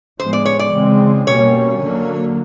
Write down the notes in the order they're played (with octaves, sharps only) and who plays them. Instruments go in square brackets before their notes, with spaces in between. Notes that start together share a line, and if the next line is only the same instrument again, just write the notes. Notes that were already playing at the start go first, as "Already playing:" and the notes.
[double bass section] A2 F3 G#3 B3 [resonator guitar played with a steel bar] C5
[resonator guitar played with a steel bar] D5
C#5
D5
[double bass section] C#3 E3 G#3 C4
[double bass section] B2 G3 A#3 C#4 [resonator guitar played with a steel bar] C#5
[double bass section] D3 F#3 A#3